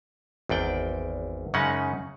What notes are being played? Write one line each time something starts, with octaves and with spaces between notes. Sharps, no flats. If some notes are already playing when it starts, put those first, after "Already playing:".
G#1 E2 D5 G5
F#2 C#3 G#3 C#4 D#4 F#5